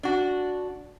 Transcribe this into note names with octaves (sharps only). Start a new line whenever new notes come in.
D4 F#4